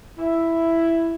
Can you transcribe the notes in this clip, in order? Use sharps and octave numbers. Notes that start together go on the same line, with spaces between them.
E4